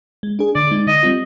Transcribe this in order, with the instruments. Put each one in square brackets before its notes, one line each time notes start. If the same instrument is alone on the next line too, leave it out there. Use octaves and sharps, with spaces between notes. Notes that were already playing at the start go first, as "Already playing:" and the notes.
[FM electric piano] G#3
D4 G#4
[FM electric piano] D3 [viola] D5
[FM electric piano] G#3 D#4
[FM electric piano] D3 [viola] D#5
[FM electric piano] G3 C4 F4